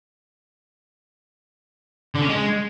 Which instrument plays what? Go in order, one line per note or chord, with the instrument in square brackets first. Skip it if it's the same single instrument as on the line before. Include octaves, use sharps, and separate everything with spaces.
[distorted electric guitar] D3
C#4
G#3